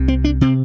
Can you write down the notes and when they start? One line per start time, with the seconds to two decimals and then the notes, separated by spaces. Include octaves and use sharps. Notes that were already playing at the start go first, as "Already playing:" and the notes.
Already playing: C2 C3
0.08 C4
0.24 D4
0.41 C3 C4